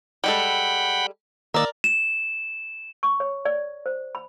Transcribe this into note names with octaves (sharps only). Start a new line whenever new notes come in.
G3 G#3 A4 F#5 G5 B5
D#3 A#3 A#4 D5 E6
E7
C#6
C#5
D5
C5
B5